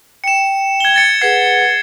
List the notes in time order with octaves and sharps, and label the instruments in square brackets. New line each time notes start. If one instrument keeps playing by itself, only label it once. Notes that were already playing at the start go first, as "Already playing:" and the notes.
[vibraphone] G5 [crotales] C#7 E7
[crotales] G#6 G7
G#6 A6 C#7
[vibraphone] G#4 B4 F#5 [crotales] G#6 C7